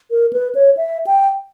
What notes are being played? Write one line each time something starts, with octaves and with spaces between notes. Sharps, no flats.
A#4
B4
C#5
E5
G5